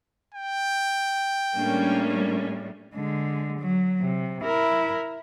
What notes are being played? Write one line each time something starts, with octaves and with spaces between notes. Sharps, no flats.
G5
A2 G3 G#3 A#3 C#4 D4
D3 G#3
F#3
C3
E4 A#4